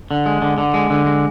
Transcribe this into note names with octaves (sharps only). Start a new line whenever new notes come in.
D3
G#3
D3
D3
G#3
D3
G#3